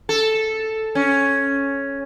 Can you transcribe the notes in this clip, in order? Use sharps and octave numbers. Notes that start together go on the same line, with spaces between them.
A4
C#4